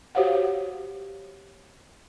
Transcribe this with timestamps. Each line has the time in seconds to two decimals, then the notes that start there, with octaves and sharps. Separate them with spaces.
0.15 F#4 G4 C5 C#5 F5 F#5